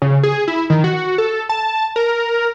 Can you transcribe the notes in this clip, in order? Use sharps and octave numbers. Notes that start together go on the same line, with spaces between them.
C#3
G#4
E4
D#3
F#4
A4
A5
A#4